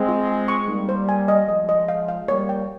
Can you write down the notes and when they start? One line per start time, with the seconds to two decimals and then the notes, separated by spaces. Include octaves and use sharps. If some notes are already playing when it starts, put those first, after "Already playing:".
Already playing: G#3 C4
0.09 F4
0.28 G#5
0.48 C#6
0.68 G3 A#3 D#4
0.89 C5
1.09 G#5
1.28 D#5
1.48 F3 G#3 D#5
1.69 D#5
1.88 F5
2.08 F5
2.28 G3 A#3 C#5
2.49 G5